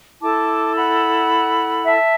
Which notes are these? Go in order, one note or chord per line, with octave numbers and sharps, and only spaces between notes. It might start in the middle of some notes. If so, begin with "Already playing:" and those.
E4 A4 A5 D6
F#5 B5
E5 A5